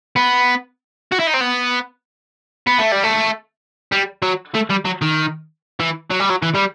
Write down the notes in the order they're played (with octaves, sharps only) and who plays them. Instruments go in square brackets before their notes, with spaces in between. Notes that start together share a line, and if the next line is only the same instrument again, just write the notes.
[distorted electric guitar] B3
F#4
E4
D#4
C4
B3
B3
A3
G3
A3
G3
F#3
A3
G3
F#3
D#3
E3
F#3
G3
F#3
E3
G3